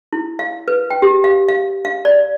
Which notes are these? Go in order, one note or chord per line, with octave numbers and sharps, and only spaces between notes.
E4
F5
B4
G5
G4
F5
F5
F5
D5